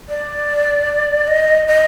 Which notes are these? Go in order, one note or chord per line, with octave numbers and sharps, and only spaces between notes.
D5
D#5
D#5